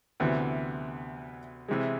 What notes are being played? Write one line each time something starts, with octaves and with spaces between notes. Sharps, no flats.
D2 C3 E3 B3
C3 E3 G#3